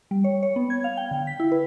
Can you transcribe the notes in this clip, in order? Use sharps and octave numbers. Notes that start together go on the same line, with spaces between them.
G3
C#5
C#5
B3
G#6
F5
G5
D3
B6
E4
B4